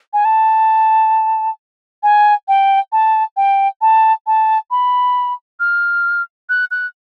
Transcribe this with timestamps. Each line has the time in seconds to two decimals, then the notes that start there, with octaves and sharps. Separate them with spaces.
0.13 G#5
0.25 A5
2.03 G#5
2.48 G5
2.92 A5
3.37 G5
3.81 A5
4.27 A5
4.71 B5
5.60 F6
6.49 F#6
6.71 F#6